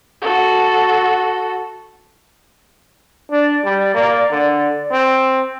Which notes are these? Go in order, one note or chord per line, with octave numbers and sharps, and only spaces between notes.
F#4 A4
D4 D5
G3
A#3
D3
C4